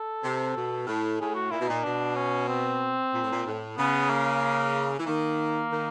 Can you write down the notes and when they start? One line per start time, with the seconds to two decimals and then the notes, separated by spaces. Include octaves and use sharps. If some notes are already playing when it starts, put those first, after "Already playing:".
Already playing: A4
0.23 C3
0.55 B2
0.87 A2
1.20 A2 G#4
1.35 F#4
1.51 A#2 E4
1.59 B2
1.68 A#2 D#4
1.83 B2 D4
2.16 C#4
2.48 C4
3.12 A#2
3.23 A2
3.31 A#2
3.45 A2
3.77 C#3 B3
4.10 A#3
4.98 E3
5.06 D#3 A#3
5.71 D#3